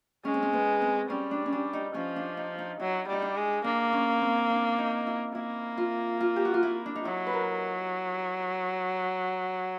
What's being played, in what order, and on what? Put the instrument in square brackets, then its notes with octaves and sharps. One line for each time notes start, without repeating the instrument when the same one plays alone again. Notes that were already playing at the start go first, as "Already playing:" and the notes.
[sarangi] G#3 [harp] C#4
[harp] C4
C#4
B3
C4
[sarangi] G3 [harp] C#4
[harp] D4
C#4
D4
D#4
[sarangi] F3 [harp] C#4
[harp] D4
D#4
D#4
[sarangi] F#3 [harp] E4
[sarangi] G3 [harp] D#4
[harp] D4
[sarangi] G#3
[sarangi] A#3 [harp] D4
[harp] C#4
C4
D4
D#4
E4
[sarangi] A#3 [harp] E4
[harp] F4
F4
G4
F#4
F4
E4
D4
D#4
[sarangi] F#3 [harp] E4
[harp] B4
A#4